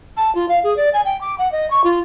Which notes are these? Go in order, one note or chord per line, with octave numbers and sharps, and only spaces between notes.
A5
F4
F5
G#4
D5
G#5
G5
D6
F#5
D#5
C#6
F4